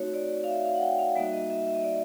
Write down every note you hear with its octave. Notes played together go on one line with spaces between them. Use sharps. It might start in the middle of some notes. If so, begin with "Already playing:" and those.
Already playing: A3 C4 D#4 F#4 C#5
D5
F5
E5
F5
F#5
G5
F5
G3 A#3 D#4 F#4 E5
D#5
E5
E5
D#5
D5